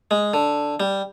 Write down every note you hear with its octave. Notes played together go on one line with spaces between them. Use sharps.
G#3
D3
G3